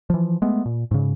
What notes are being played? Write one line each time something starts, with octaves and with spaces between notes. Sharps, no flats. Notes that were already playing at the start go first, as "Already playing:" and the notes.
E3 F3
G#3 A3 B3
A#2
G#2 C#3